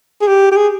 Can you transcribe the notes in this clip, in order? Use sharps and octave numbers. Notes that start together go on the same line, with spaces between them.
G#4
G4
G4
G#4